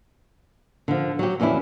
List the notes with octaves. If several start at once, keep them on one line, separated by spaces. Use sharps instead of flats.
D3 F3
F#3 G4
F2 E3 C#4 D4 E4